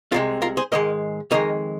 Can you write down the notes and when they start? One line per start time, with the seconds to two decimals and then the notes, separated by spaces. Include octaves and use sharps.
0.12 C2 C3 G#3 F4 A#4
0.42 F4 A#4
0.57 G#4 C5
0.72 G#2 D#3 G#3 A#4 D#5
1.31 F2 D#3 G#3 A#4 D#5